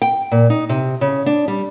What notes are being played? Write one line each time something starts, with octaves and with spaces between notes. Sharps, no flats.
G5
A#2
D#4
C3
C#3
D4
G3